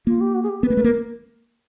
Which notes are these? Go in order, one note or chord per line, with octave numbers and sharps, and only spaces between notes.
A#3 F4
G4
F#4
G#4
G4
B3 B4
A#3
A3
A#3 A#4